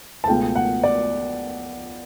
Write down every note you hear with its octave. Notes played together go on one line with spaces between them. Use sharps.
A5
C#2 B2 A3 G5
F#5
D5